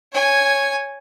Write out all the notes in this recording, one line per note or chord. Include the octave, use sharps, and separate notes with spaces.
C#5 G#5